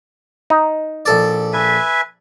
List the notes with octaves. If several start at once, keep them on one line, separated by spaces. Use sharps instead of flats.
D#4
A#1 A4 D5
B4 E5 G#5